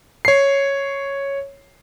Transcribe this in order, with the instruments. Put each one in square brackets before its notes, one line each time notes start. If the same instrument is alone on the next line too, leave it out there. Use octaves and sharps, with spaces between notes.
[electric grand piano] C#5 C7